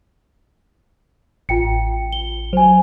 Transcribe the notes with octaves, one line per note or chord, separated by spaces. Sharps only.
A1 F4 G5 C#7
G7
F#3 C5 G#5